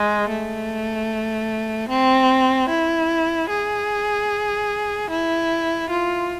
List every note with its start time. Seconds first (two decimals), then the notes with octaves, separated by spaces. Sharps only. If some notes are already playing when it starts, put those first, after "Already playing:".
Already playing: G#3
0.29 A3
1.90 C4
2.70 E4
3.50 G#4
5.10 E4
5.90 F4